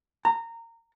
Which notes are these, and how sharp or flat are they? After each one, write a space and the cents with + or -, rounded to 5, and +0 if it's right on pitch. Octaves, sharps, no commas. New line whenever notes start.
A#5 -20